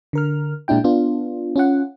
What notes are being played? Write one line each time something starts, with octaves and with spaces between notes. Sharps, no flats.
D3 A#4 F6
A#2 G#3 D4 E4 G5
B3 D4 F4
C#4 F4 F#5